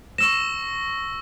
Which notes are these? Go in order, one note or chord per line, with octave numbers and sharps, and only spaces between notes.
C#6 E6 A#6 E7